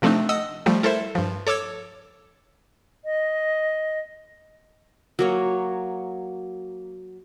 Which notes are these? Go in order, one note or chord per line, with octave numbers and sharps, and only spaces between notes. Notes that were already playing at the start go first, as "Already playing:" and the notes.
C3 F3 A3 C4 D4 D#4
D#5 F#5 D#6 E6
F3 G3 A3
E4 A4 A#4 C5 E5
G2 F3
A4 C#5 D6 E6 G#6
D#5
F#3 A#3 C#5